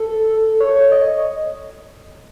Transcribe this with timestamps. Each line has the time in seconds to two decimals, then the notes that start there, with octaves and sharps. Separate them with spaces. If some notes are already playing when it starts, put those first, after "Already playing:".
Already playing: A4
0.60 C#5
0.76 C#5
0.92 D#5